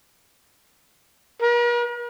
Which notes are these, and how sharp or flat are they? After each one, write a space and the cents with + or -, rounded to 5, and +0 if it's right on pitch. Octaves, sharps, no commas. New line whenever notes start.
A#4 +45